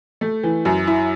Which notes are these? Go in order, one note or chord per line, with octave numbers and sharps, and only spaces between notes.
A3
E3
F#2
E4